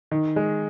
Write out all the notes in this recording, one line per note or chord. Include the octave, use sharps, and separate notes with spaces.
D#3
G#3